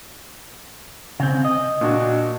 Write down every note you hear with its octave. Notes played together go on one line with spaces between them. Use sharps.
C#3 C4
D#5
A#2 D4 F#4